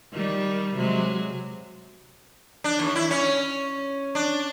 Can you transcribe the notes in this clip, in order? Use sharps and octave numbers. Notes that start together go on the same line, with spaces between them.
D#3 G3
C3 F#3 G#3
D4
D#2
E4
C#4
D4